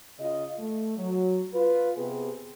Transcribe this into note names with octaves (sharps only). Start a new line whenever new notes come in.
C#3 F4 D#5
A3
F#3
F4 B4
C3 B3 G4 G#4